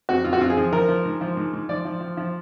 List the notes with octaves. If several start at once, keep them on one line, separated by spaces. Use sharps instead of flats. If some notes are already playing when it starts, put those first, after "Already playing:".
F2 F#4
F2 F4
F#4
F2 F4
G#4
F3
F3 A#4
F3
G#2
F3
G#2
G#2
F3 D5
F3
F3
F3